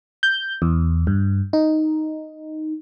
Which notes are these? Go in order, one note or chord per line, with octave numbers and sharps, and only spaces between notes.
G6
E2
G2
D#4